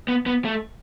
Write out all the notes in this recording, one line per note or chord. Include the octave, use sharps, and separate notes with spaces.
B3
B3
A3